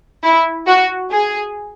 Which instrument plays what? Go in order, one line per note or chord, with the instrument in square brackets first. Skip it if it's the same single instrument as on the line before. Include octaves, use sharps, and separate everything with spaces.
[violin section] E4
F#4
G#4